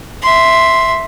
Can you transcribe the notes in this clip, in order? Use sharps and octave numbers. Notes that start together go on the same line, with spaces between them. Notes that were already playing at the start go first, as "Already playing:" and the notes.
E5 C6